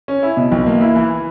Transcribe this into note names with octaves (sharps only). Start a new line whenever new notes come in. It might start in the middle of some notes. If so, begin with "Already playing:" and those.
C#4
E4
B2
B1
A#3
E4
E3